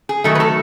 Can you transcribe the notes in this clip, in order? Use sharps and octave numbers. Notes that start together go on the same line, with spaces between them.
G#4
D#3 F#3 A3 A4
B4
A4